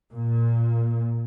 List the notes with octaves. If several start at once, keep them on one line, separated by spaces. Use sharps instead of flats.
A#2